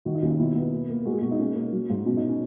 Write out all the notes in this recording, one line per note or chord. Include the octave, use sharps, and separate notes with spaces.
D#3 F#4
D#4
D#2 C#4
D#4
B2 E4
B3
A#3
A#3
G#3 F#4
G#4
B2 F#4
D#4
A#3 C#4
A#3
F#3
G#2
B2 C#4
D#4
C#4